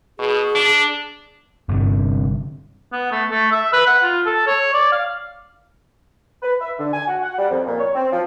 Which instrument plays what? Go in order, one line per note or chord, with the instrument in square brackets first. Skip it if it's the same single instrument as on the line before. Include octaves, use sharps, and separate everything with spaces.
[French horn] B2 [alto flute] G#4
[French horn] D4
[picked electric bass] G1 G2 C3
[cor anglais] B3
A3
A3
E5
B4
F#5
F4
A4
C#5
D5
F5
[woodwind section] B4
E5
D3
G#5
F#4
F#5
G3
F2
A#2
C#5
C4
F3